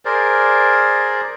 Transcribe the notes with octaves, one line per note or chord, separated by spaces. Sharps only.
G#4 A#4 C5 D5